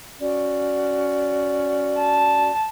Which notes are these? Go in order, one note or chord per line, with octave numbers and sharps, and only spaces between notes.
C#4 F#4 D5
A5